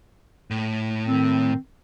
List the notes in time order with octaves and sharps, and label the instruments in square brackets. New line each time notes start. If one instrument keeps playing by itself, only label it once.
[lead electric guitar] A2
[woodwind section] D#3 C4